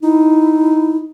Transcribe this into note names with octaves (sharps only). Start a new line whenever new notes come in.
D#4 E4